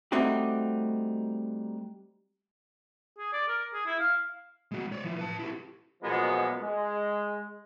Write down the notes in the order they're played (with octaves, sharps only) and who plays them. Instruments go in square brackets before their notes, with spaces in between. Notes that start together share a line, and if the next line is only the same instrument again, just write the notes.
[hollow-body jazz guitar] G3 A3 C4 D#4 F#4 G4
[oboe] G#4
D5
A#4
G#4
E4
F5
[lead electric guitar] G#3 F#4
C#5 D5
F3 E4
B4 A5
E4 G4
[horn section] F#2 B2 F3 G#3 A#3 B3
G#3